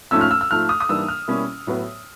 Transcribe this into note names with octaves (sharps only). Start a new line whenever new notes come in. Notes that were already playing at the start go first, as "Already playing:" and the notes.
G#2 F3 A3 C#4 E6
F6
E6
E6
G#2 F3 A3 F6
D#6
D#6
G#2 E3 G3 A#3 D4 E6
F6
B2 G3 A#3 C#4 E4
A2 F#3 B3